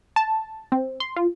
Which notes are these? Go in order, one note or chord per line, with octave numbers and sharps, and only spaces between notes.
A5
C4
C6
F4